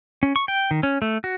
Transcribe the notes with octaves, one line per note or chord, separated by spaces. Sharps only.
C#4
C#6
G5
D#3
C#4
A3
F#4